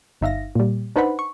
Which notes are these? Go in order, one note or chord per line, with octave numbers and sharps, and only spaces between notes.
G1 D#4 E5 F5 A#6
A#2 G3
D4 D#4 B4 C5 F#5 B5
C#6